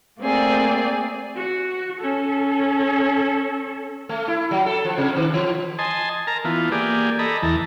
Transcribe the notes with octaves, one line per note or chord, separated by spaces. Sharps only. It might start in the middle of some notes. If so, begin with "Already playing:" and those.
A3 A#3 C4 G#4 D5
F#4
C#4 A4
A3
E4
F#3
A4
F3
C3
D#3
E3
D#5 G#5 A5 C6
A#4 A5 A#5
E3 B3 F4
A#3 G4 G#4 D5
A4 D#5 A#5 B5
E2 E3 A5 A#5